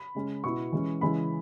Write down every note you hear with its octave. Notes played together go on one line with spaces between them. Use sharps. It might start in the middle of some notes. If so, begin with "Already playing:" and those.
Already playing: B5
C#3 G#3 C#4
B2 B3 E4 C#6
E3 G#3 C#4 E4
C#3 E3 G#3 C#4 E4 B5